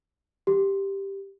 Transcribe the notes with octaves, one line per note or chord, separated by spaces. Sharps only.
G4